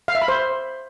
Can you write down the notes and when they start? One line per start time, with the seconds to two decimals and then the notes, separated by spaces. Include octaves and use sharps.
0.08 F5
0.15 E5
0.22 B5
0.28 C5